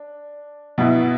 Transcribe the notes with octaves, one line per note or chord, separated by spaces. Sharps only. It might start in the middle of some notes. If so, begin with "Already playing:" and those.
Already playing: D4
B2 B3 E4